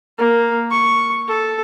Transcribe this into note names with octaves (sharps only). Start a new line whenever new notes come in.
A#3
C#6
A4